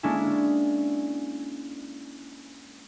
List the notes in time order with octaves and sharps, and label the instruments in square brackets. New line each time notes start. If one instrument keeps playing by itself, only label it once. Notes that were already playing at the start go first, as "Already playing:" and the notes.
[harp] G#3 A#3 C#4 D4 E4